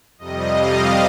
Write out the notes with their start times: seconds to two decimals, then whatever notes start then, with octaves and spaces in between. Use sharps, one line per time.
0.18 F2 C3 G3 D#5
0.52 F5